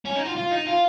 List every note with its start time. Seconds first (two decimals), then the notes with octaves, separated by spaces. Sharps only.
0.05 C#4
0.16 D#4
0.25 F4
0.36 F4
0.51 D#4
0.66 F4